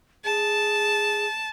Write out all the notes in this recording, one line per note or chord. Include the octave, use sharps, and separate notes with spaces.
G#4 A5